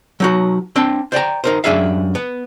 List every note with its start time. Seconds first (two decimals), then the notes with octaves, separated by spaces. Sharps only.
0.20 F#3 D#4 F#4
0.76 C4 D4 G5 C6
1.12 C5 D5 G5 A#5
1.44 D#4 A#4 C5
1.64 F#2 D#3 D4 G#4 E5 F5
2.15 B3